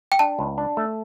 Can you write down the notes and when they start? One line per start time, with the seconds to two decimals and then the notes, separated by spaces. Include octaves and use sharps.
0.12 G5
0.19 D4 A5
0.39 C#2
0.58 D4
0.77 A3